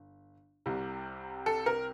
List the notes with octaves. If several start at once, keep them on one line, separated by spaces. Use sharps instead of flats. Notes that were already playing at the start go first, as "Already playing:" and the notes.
Already playing: G1
C2 C3 G3
A4
A#4